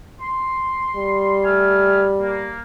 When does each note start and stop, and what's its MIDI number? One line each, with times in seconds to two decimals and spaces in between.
0.21 1.44 84
0.96 2.56 55
1.44 2.04 57
1.44 2.04 80
1.44 2.04 89
2.21 2.60 58